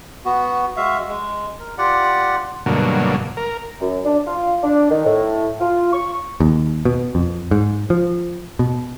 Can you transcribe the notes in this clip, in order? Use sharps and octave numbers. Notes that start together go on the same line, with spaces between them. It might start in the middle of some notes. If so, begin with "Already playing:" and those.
B3 F#4
G#3 F#4 E5 F5
G#3
A#4
F4 G4 D5 F#5
G2 B2 D3 F#3 A#3
A#4
F#2
D4
F4
D4
D#3
A2
F4
C#6
D#2
B2
F2
G#2
F3
B2